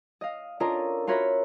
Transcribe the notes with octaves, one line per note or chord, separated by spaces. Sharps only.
D#5 F5
C#4 D4 F4 A4 A#4 D#5
F4 F#4 A#4 C#5 E5 B5